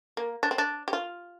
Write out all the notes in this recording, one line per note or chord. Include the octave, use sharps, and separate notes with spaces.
A#3
D4
C4
D4
G4
F4